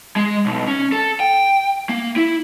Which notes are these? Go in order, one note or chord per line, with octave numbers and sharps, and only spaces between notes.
G#3
B1
C#4
A4
G5
A#3
E4